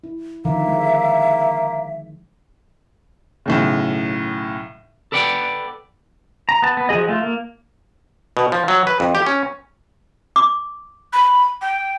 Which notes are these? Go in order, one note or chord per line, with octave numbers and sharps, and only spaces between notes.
E4
D3 D#3 F3 A#3 E5
G#3
B1 A2 C#3
A4 B4 D5 F#5 G5
A#5
B3 A5
B3
F3 F#3 G#4 D#5
A3 F4
A#3
B2
F3
F#3
B4
F2
G4
C#4
D6
B5
G5